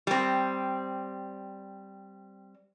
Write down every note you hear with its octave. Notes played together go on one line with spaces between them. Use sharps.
G3 C4